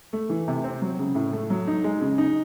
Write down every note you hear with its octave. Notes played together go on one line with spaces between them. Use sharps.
A3
E3
C3
C4
F#3
C#3
A2
A3
F#3
D#4
G#3
C#3
D#4